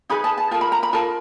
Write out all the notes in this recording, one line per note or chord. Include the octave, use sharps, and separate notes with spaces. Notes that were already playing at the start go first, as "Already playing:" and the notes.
D#4 G#4 B4 B5
A5
A5
F4 A#4 A5
B5
A#5
B5
F4 A#4 A5